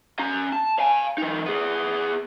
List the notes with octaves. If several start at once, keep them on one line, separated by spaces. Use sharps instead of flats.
C#4 A#5
A5
F5 G#5
E3 D#4
B3 G#4